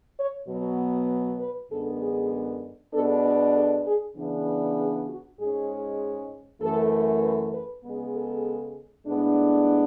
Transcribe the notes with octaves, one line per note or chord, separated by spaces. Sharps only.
C#5
B2 F#3 B3
B4
F#2 D3 G#3 B3 D4 A4
G#4
B2 G#3 B3 D4 A4
B4
A4
G#4
C#3 E3 B3 D4
G#4
F#4
G#2 G#3 C#4 G#4
F#2 E3 A3 A4
B4
B4
C#3 G#3 B3
A4
A2 G#3 B3 D4